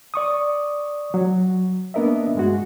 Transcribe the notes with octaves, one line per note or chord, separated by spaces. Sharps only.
D5 C#6 D#6
F#3
A#3 B3 D4 A#4 D#5 E5
G2 G#3 F#4